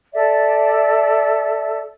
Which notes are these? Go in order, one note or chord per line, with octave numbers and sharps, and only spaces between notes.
A4 D5 E5